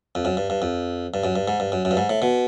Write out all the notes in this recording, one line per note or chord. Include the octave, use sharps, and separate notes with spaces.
F2
F#2
G2
G2
F2
G2
F#2
G2
G#2
G2
F#2
F#2
G2
G#2
A2
B2